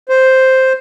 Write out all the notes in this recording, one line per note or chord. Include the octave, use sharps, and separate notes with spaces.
C5